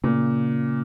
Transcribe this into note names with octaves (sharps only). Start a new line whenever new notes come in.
A#2 C#3